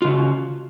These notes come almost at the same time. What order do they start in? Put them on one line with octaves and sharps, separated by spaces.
F4 C#3 F#4